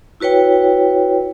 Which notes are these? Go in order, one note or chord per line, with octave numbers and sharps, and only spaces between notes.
E4 F#4 B4 C#5 G5